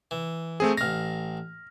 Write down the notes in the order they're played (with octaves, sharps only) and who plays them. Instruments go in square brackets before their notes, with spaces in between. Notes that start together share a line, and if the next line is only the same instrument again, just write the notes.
[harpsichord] E3
[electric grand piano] A3 C4 G#4
[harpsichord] A1 F5 [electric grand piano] F6 A#6